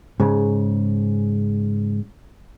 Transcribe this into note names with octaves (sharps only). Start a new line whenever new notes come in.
G#2 C#3